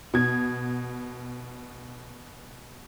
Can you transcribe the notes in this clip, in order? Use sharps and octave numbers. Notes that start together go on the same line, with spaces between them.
B2 G#6